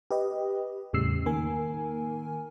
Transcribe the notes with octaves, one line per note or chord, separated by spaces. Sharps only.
G4 B4 D#5
E2 A2 C#3 G3 E6 C7
D#3 A#3 A#4 G#5